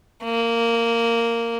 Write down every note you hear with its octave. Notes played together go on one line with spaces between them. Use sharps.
A#3